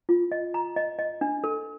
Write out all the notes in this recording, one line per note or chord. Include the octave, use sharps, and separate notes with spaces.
F4
D#5
A#5
D#5
D#5
D4
A4